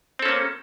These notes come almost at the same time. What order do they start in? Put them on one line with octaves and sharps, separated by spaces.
C4 A4 C#4 A#3